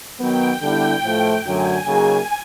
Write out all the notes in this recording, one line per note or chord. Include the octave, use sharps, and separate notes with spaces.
D#3 F#3 B3 G5
D3 G3 B3 E4 G5
A2 F3 A3
F#2 D3 F#3 A3 G#5
C#3 F#3 A#3 D#4 G#4